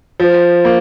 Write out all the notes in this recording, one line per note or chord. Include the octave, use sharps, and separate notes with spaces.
F3
A#3